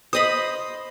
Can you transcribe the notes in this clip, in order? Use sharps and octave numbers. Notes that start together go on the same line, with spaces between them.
C5 D#5 B5 D#6